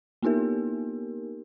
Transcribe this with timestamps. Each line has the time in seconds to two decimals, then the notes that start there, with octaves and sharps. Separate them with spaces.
0.22 A#3 B3 D#4 G4 A#4